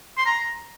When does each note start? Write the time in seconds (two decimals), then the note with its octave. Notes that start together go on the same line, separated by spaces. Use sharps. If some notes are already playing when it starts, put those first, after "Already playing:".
0.18 C6
0.26 A#5